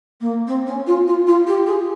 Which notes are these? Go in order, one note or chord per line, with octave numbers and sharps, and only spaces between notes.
A#3
C4
C#4
F4
F4
F4
G4
G#4